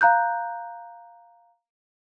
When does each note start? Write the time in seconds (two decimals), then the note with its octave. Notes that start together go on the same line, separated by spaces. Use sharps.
0.01 F5 A#5 F#6 G6